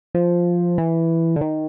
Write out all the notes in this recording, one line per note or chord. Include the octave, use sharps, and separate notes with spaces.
F3
E3
D3
D#3